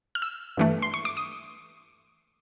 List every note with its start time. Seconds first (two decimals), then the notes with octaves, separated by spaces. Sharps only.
0.15 F6
0.22 E6
0.57 G2 E3 A3
0.82 C6
0.94 C#6
1.05 D6
1.17 D#6